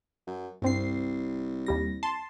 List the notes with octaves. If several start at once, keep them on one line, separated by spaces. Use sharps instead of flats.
F#2
C2 G2 C4 C7
D#2 G3 A#6
A5 C6